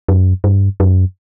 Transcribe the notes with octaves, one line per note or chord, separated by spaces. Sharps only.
F#2
G2
F#2